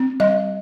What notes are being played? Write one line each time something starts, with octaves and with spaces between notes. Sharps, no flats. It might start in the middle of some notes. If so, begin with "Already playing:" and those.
Already playing: C4
G3 D#5